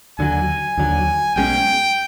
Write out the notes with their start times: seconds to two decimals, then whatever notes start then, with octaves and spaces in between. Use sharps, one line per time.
0.19 D#2 D3 F#3 G#5
0.77 D#2 D3 F#3
1.36 B1 B2 G#3 C#4 G5